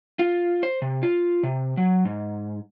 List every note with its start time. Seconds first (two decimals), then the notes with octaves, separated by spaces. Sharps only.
0.19 F4
0.63 C5
0.82 C3
1.03 F4
1.43 C3
1.77 F#3
2.05 G#2